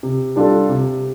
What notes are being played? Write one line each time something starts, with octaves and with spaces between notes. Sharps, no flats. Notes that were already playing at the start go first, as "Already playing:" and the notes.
C3
G3 D4 F4 A4
C3